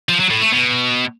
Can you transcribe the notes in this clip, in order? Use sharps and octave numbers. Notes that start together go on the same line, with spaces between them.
F3
F#3
A2
A3
B2